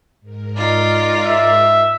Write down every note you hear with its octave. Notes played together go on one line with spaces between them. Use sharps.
G#2 A#4
D#4 F4 D5
E5